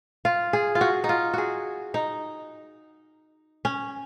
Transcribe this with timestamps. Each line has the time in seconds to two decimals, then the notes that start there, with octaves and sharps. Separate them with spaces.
0.25 F4
0.53 G#4
0.75 F4
0.81 F#4
1.04 D#4
1.09 F4
1.33 F#4 G#4
1.94 D#4
3.65 C#4